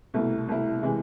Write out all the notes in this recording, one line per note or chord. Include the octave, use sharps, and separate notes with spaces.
C2 B2 A3 E4
C2 B2 A3 E4
C3 E3 G#3